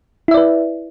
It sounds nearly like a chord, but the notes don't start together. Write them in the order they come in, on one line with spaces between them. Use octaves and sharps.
E4 E5 D5 B4